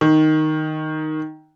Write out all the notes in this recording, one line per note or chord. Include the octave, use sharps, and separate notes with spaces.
D#3